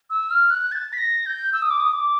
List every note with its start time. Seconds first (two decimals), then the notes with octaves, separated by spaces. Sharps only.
0.10 E6
0.30 F6
0.50 F#6
0.72 A6
0.93 B6
0.98 A#6
1.26 G6
1.53 E6
1.62 D#6
1.70 D6
1.80 D#6
1.93 D6